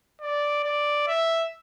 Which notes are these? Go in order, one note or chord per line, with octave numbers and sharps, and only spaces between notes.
D5
D5
E5